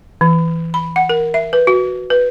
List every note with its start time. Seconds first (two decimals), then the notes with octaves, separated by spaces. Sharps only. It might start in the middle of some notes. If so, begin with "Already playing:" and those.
0.21 E3
0.74 B5
0.96 F#5
1.09 A#4
1.34 E5
1.53 B4
1.67 F#4
2.10 B4